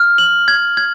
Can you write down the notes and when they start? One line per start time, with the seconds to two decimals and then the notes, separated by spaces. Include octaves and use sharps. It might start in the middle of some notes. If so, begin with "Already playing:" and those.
Already playing: F6
0.18 F#7
0.48 G#6
0.77 G#6